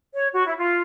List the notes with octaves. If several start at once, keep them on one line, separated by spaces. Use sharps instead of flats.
C#5
F#4
E4
F4